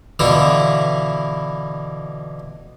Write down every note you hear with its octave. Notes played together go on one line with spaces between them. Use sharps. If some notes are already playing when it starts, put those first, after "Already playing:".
B2 D3 E3 E4 F4